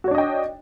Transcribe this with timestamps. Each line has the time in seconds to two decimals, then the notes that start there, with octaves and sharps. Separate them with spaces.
0.04 F#4
0.08 C#5
0.11 D4
0.15 D#5
0.18 G5